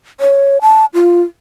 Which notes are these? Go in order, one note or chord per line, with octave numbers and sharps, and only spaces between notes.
C#5
A5
F4